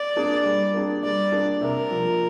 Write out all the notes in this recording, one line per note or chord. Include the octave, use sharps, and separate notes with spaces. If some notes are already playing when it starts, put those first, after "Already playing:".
Already playing: D5
A#3 D4 G#4
G3
A#3 D4 G#4
G3 D5
A#3 D4 G#4
C3 A#4
F3 A#3